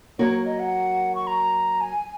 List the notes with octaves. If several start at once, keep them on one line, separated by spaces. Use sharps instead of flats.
F#3 A#3 F#4 A#4 C#5
D#5
F#5
C#6
A#5
G#5